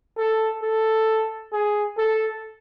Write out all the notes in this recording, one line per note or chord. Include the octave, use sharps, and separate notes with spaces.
A4
A4
G#4
A4